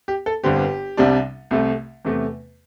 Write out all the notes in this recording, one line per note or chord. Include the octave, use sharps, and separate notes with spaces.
G4
A4
G1 G2 D3 C4 G4
C2 C3 G3 D4
C2 C3 A3
E2 C3 A3